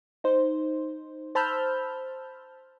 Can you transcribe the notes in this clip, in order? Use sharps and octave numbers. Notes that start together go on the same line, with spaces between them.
D#4 C5
C5 A5 B5 E6 F6 G6